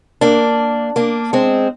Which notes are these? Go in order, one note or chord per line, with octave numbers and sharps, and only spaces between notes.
A#3 D4
A#3 D4
G#3 C4